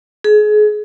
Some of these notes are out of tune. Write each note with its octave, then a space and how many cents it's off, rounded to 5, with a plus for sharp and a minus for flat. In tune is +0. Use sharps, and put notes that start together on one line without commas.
G#4 +30